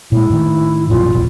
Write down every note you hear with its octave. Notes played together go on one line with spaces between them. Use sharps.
A#2 G#3 E4
A2 D#3
A#1 F#2 B2 F4
D#1 A#1 B2